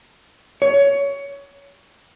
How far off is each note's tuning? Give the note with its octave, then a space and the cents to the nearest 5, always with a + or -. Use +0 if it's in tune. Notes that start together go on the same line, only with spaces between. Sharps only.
C#5 +20